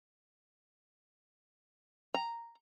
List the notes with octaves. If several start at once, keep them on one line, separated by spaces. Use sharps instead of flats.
A#5